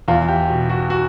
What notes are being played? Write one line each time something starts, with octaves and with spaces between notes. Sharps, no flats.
E2 F4
G4
B2
F#4
F#4